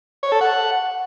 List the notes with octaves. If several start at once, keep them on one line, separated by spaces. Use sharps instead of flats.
C#5
A4
F#5